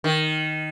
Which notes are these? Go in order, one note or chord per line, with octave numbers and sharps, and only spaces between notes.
D#3